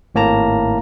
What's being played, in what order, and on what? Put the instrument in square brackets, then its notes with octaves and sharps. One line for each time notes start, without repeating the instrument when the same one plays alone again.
[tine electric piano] G#1 A2 A#3 A5 A#5